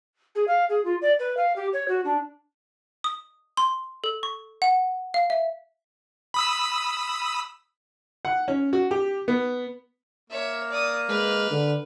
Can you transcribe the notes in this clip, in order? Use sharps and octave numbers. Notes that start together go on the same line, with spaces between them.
G#4
F5
G#4
F4
D5
B4
F5
G4
C#5
F#4
D4
D#6
C6
A4
C#6
F#5
F5
E5
B5 D#6 E6
F#5
C#4
F#4
G4
B3
A#3 C#5 E5
D5 D#6
G#3 B4 F6
D3